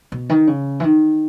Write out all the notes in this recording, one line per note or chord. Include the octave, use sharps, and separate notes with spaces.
B2
D#3
C#3
E3
D#3